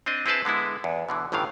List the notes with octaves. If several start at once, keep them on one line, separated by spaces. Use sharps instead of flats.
C4 D4 D#5
C4 E4 G#4 B4 C5 A5
D3 G#3 B3 E4
E2
B2 D3 E3
G1 A2 D#3 E3 F5